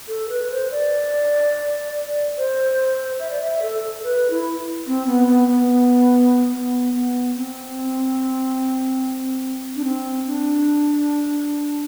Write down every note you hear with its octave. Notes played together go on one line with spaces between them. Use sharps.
A4
B4
C5
D5
C5
E5
D5
E5
A4
B4
E4
C4
B3
B3
B3
B3
B3
C4
D4
C4
D4